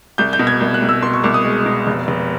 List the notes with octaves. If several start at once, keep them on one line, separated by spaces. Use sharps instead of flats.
C2 G6
G6
B2
G#6
C2
F#6
C2
E6
B2 C6
C#6
C2 D6
D#6
G#3
B2
F1
F1